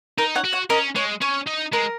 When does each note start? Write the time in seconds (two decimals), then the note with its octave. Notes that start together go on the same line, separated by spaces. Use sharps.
0.18 D#4 A#4
0.35 C#5 F#5
0.44 F#4
0.53 C#5 F#5
0.70 C#4 A#4 D#5
0.96 G#3 C#5
1.22 C#4 C#5
1.47 D#4
1.73 G#3 A#4